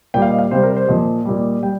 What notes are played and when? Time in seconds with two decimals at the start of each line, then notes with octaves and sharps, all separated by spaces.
0.14 A#2 G3 G5
0.22 F5
0.30 D#5
0.39 F5
0.51 C3 G3 C5
0.63 A#4
0.76 C5
0.88 A#2 F3 D#5
1.25 A#2 G3
1.63 G3 G5